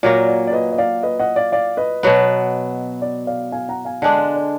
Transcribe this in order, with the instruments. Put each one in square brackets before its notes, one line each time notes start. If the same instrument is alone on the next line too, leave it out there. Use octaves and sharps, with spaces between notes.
[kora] A#2 F#3 A#3 [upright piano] D5
[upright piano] D5
D5
B4 D#5
D#5
D5 F5
B4 D#5
D#5 F#5
D5 F5
D5 F5
B4 D#5
[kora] B2 F#3 B3
[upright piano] D5
D5 F5
F5 G#5
F#5 A#5
F5 G#5
[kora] D3 G#3 D4 [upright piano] D#5 F#5
[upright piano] D5 F5
D5